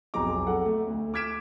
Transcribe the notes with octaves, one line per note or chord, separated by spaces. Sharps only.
B1 F2 G#4 A#5 D6
A4 F#5
A3
D2
D6 F6 G#6 B6 D7 E7